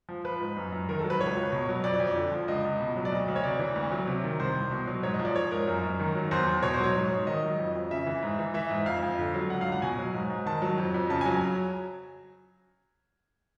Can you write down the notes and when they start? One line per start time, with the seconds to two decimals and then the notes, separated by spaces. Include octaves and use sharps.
0.09 F3
0.24 F3 B4
0.41 G#2
0.57 F#2
0.72 F#2
0.89 D#3 A#4
0.99 A4
1.04 F#3
1.10 B4
1.21 C#2 C#5
1.37 C#2
1.52 B2
1.69 F#3
1.84 F2 D5
2.00 F2
2.16 D3
2.32 F3
2.48 C#2 D#5
2.65 C#2
2.80 B2
2.96 F#3
3.05 D5
3.12 D2 D#5
3.28 D2
3.36 C#5
3.44 C3 D5
3.59 E3
3.76 D2
3.92 F#3
4.07 C3
4.24 D#3
4.40 C2 C5
4.55 C2
4.71 B2
4.87 F#3
5.03 G#2 C#5
5.14 D#5
5.19 F3
5.25 D5
5.35 F3 C#5
5.51 G#2 A#4
5.67 F#2
5.83 F#2
5.99 D#3
6.15 F#3
6.31 E2 C5
6.47 E2
6.62 B2 C#5
6.74 C5
6.79 F#3 C#5
6.95 G#2
7.11 G#2
7.27 D#3 D#5
7.43 F#3
7.59 F2
7.75 F2
7.91 C#3 E5
8.06 E3
8.23 G#2
8.39 E3
8.54 E3 E5
8.71 G#2
8.86 F2 F5
9.03 F2
9.19 D3
9.34 F#3
9.50 C#2 F#5
9.61 F5
9.66 C#2
9.72 F#5
9.82 B2 G#5
9.98 F#3
10.14 G#2
10.30 G#2
10.46 D#3 A5
10.62 F#3
10.78 F2
10.94 F2
11.10 C#3 A5
11.21 G#5
11.26 F#3
11.32 G#5